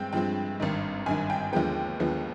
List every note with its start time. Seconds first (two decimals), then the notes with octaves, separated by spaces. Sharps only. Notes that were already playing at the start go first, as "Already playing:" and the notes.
Already playing: G2 G#3 C4 G5
0.13 G2 F3 G#3 C4 G5
0.60 G#1 G2 D#3
1.06 G#1 G2 D#3 G#5
1.30 G5
1.53 D#2 D3 F3 G#3 B3 G5
2.00 D#2 D3 F3 G#3 B3